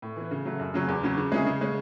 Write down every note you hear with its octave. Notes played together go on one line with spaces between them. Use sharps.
A2
E3 B3
C#3
F#3 A3
F#2
C#3 F#3 C#4
E2
C#3 F#3 C#4
C#3
G#3 C#4 E4 G#4
C#3
G#3 C#4